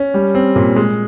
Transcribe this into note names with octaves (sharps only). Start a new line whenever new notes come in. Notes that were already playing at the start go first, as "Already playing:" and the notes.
Already playing: C#4
G3
C4
A#2
G#3